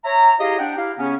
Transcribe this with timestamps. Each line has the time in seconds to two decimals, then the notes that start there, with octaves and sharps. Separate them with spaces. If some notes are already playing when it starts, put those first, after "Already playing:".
0.05 C#5 E5 A#5
0.40 E4 G4 G#4 D#5 F5
0.59 D4 F#5 G5
0.77 E4 G4 F5
0.98 C#3 B3 C#4